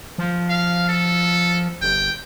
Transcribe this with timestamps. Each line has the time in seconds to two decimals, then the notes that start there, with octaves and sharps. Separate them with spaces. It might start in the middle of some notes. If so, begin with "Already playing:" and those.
0.18 F3
0.49 F5
0.89 A4
1.82 G1 G5